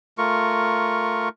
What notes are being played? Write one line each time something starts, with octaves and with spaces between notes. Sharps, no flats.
A3 F4 A#4 C#6